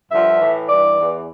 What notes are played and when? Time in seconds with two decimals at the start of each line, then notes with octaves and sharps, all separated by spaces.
0.10 G2 D3 F3 E5
0.40 A2 E3
0.68 G2 E3 D5
0.97 E2 E3